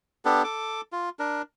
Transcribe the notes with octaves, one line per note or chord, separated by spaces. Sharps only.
B3 D4 G4 A4
A4 D6
F4
D4 A#4